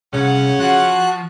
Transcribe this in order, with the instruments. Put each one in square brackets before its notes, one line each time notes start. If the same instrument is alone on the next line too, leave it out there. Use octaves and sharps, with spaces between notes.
[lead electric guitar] C2 [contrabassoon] C#3 [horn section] C#4 F#5
[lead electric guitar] F3 [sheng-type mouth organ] F#4 F#6